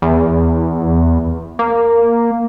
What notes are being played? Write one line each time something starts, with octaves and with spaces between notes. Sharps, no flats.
E2
A#3